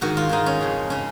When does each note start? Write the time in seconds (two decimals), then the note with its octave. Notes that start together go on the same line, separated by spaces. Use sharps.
0.01 G#2 D#3 F#4
0.17 F4
0.29 G#2 D#3 D#4
0.46 C#4
0.61 F2 C#3
0.90 C#3 C#4